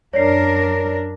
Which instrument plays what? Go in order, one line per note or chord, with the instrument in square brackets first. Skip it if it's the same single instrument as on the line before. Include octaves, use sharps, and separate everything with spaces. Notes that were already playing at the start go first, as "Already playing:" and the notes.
[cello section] F#2 D4 A#4 [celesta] C#5 D5 C7